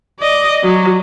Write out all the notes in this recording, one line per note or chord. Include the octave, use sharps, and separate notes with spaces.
D5 D#5
F#3